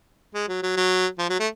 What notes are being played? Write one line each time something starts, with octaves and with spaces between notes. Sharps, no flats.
G#3
F#3
F#3
F#3
F3
F#3
A3